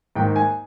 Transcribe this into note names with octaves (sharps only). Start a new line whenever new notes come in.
G#2 D#3 A#3 G5
G#5